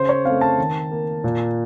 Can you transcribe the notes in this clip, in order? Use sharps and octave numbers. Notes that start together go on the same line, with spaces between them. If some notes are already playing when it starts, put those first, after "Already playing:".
Already playing: C#3 C5
C#5
A3 C4 F5
A5
D#3
A#3
A#2